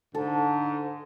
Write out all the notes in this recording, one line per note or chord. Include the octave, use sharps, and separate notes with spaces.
G#2 D3 A4